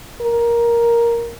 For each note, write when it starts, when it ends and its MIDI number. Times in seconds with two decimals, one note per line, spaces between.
0.21 1.35 70